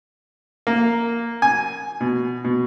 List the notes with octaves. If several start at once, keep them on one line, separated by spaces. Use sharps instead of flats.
A#3
G#5
B2
B2